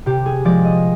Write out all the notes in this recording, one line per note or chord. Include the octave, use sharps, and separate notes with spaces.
C3 G4
G#4
F3 G#3 D5
D#5